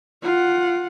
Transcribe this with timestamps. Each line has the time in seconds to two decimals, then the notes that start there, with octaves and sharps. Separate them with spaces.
0.23 F4 F#5